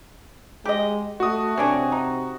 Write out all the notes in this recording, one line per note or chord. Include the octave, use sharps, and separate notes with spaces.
G#3 G4 D#5
A3 F#4 D#6
C3 C#4 D4 G#4
D#4